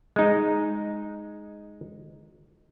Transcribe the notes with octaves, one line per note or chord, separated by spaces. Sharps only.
G#3 D#4